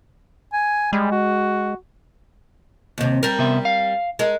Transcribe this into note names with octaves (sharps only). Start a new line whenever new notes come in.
G#5
G3 G#3
F#4
D#2 C3
G3 A#4
C3 B3 E5
F5
G#3 A#4